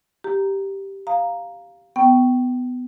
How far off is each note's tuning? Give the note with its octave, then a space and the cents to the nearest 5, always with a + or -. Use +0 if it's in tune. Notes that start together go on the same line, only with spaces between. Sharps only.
G4 -5 A#5 +0
F5 +0 A#5 +0 D#6 -15
B3 +15 G5 -15 C#6 +0